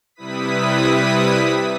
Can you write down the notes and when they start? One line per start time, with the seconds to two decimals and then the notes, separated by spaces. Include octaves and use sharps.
0.15 C3 G3 E4 B4 D#6 B6